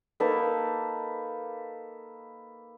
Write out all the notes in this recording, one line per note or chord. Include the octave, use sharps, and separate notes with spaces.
A#3 D#4 A4 B4